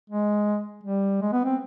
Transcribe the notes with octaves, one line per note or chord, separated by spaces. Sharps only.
G#3
G3
G#3
B3
C4